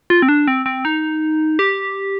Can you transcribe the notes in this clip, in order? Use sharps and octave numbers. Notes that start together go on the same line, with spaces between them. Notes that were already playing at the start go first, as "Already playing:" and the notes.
F4
C4
D4
C4
C4
D#4
G4